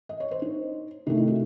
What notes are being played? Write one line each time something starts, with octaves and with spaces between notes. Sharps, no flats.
D#5
C#5
C5
D#4
C3 D#3 A3 D#4
E4
F#4